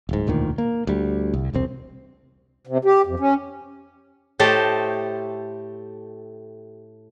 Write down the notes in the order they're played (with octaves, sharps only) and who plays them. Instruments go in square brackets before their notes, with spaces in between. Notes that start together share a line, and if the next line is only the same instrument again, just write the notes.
[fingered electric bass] D1 G#2
E1 D2 A#2 D#3
A#3
D2 G3
C2
E1 C2 C4
[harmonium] C3
G4
F2
C#4
[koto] A2 A3 G4 A4 C5 D#5